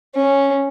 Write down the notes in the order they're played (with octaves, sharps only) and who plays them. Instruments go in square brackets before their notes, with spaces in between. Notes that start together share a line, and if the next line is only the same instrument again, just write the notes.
[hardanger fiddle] C#4